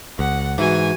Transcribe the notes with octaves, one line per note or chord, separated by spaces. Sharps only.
C#2 F#5
G#2 E3 F#4 G#5